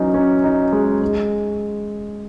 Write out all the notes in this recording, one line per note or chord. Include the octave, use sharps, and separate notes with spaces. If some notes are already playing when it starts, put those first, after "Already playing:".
Already playing: E3 F#3 C#4 D#4
C#4
D#4
G#3
G#3